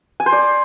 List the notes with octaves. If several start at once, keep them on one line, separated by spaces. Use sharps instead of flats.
G#5
C5
D5